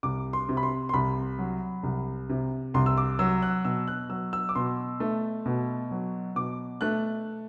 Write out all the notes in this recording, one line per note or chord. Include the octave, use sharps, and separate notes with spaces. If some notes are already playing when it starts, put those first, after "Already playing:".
C2 D6
C6
C3
B5
C6
C6
C2 B5
F#3
C2
C3
C2 C6
E6
D6
F#3 E6
F#6
B2 E6
F#6
F#3 E6
E6
D6
B2 C6
A3
B2
F#3
B2 D6
A3 F#6